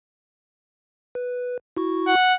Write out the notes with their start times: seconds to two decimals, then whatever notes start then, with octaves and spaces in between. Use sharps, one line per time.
1.15 B4
1.77 E4 F#4 C#6
2.07 F#5